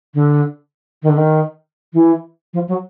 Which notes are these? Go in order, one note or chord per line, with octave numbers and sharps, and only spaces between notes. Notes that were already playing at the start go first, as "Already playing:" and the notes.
D3
D#3
D3
D#3
E3
F3
F#3